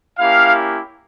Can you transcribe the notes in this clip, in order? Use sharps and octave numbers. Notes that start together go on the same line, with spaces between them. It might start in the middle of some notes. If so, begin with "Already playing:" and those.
A#3 C#4 E4 G4 F5